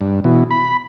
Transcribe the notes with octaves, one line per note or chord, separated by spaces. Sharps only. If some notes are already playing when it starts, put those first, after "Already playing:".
G2
B2 E3
B5